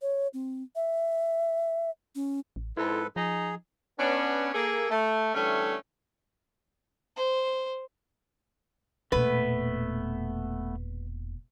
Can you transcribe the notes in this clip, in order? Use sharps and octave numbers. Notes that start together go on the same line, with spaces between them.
C#5
C4
E5
C#4
A1
F2 G#2 E4 A4 B4
F3 D#4 G#4
B3 C#4 D4
A#3 G#4 A4
A3
D3 E3 G3 A3 C#4
C5
E1 A#2 A3 B3 B4